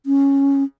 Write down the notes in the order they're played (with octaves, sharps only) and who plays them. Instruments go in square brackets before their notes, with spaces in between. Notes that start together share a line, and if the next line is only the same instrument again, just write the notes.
[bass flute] C#4